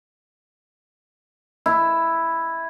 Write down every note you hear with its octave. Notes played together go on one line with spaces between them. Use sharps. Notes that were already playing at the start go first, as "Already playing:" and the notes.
E4